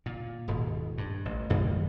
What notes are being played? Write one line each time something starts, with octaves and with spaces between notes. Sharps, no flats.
A#2
D#1 G#2 B2
G2
A1
A1 F#2 D#3 G#3